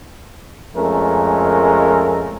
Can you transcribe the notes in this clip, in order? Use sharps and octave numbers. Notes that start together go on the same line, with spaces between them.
F2 G#3 A3 C#4 A#4